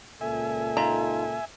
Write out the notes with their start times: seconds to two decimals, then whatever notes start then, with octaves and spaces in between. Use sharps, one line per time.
0.21 C#2 A#2 A4 E5 G#5
0.77 D#4 F4 A#5